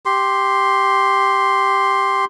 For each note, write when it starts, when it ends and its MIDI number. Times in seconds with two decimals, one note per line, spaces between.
0.06 2.25 67
0.06 2.25 84